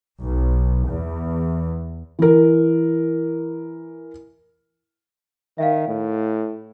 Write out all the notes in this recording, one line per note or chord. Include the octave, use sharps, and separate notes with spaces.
B1
E2
E3 A#4
D#3 E5 F5
A2